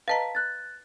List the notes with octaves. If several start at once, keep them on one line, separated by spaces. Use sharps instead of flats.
B4 D#5 F5 A5 A#5 B6
F#6 A6